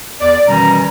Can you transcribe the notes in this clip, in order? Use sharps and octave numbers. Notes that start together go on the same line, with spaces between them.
E2 D5
B2 D#3 E3 G3 C#4 A#5